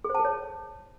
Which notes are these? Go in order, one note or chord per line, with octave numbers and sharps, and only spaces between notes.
G#4
C5
A5
G#4
C#5